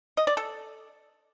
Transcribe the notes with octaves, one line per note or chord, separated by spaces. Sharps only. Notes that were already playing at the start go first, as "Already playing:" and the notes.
D#5
D5
A4